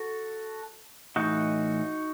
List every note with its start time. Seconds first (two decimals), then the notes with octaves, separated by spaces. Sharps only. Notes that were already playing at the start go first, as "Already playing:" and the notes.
Already playing: F#4 A4
1.16 A2 E3 D#4 F#4